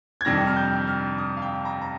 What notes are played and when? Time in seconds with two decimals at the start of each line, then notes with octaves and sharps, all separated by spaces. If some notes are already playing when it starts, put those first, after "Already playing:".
0.21 G#6
0.25 F2 C3 D#3 G3 A#6
0.47 F6
0.57 G6
0.88 F6
1.18 D#6
1.37 F5
1.42 G5
1.65 A#5
1.82 A#5